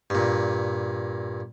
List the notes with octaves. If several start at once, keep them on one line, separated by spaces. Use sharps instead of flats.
G2 A#2